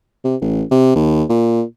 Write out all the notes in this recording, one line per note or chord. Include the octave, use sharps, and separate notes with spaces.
C3
A1
C3
D#2
A#2